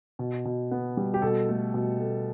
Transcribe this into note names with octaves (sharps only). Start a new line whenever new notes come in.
B2
B2
B3
G3
G4
B2 A4
A3
B2
A3